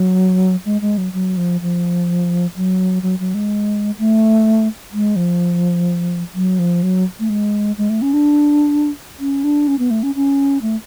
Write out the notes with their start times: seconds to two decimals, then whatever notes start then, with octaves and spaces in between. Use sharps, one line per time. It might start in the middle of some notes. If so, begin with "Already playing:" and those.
Already playing: F#3
0.66 G#3
0.81 G#3
0.98 F#3
1.13 F#3
1.37 F3
1.61 F3
2.56 F#3
3.03 F#3
3.19 F#3
3.34 G#3
3.99 A3
4.93 G#3
5.16 F3
6.35 F#3
6.59 F3
6.83 F#3
7.19 A3
7.30 G#3
7.78 G#3
7.90 A3
8.02 C#4
8.13 D4
9.20 C#4
9.44 D4
9.68 C#4
9.79 B3
9.90 A3
10.03 C#4
10.15 C#4
10.62 A3